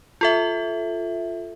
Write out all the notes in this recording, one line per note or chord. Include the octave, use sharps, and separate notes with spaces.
F4 A4 E5